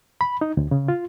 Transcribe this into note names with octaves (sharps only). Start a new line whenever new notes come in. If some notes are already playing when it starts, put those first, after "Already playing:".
B5
D#4
D2
C#3
F4